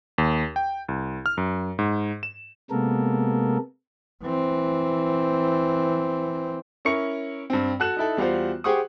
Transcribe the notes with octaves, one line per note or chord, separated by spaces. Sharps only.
D#2
G5
C2
F6
F#2
G#2
E7
C3 G#3 A#3 B3 A4 A#4
E3 C4
C#4 E4 A#4 C#6 C#7
G2 C4
F#4 A4 F#6 E7
D#4 E4 A4
E2 G3 F4 F#4 C5
G4 G#4 C5 F#5 C#6 D#6